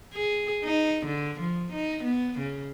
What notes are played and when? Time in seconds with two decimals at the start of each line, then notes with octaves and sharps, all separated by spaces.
0.14 G#4
0.64 D#4
1.06 D3
1.40 F3
1.72 D#4
2.03 B3
2.39 C#3